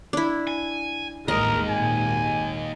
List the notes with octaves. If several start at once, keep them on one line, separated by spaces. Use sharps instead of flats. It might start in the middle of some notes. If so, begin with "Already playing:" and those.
D4 E4
G#5
A1 D#2 D#3 G#3 A#3 A#4 D#5
G#1 A#2 G#5